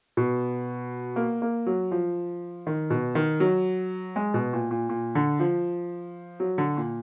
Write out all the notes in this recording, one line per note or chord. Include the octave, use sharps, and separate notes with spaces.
B2
A#3
A#3
F#3
F3
D#3
B2
D#3
F#3
G#3
B2
A#2
A#2
A#2
D3
F3
F#3
D3
A#2